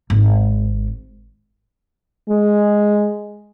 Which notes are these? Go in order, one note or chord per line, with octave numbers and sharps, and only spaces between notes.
G#1
G#3